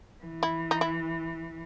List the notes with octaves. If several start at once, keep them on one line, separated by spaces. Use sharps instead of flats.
E3
E4
D#4
E4